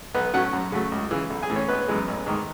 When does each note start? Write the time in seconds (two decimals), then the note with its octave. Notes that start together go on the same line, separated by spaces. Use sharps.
0.14 B1 B3 B4
0.33 A2 F#3 A3 C#4 F#4 F#5
0.53 F#2
0.72 C#3 F#3 A3
0.92 C#2
1.11 C#3 E3
1.30 B1
1.43 G#4 G#5
1.50 A2 E3
1.56 C#4 C#5
1.68 G#1 B3 B4
1.88 F#2 E3 G#3
2.08 A1
2.26 G#2 D#3